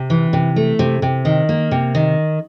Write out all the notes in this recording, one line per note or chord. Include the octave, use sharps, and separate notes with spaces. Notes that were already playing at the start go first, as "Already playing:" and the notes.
Already playing: C3
E3
C3
A3
C3
C3
D#3
A#3
C3
D#3